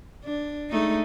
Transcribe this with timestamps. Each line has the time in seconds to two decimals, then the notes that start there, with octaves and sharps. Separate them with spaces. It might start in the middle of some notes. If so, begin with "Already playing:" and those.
0.24 D4
0.70 G#3 A3 D#4